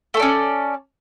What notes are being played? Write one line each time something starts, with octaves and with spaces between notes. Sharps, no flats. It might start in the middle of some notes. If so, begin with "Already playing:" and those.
A3 C#4 A4 D5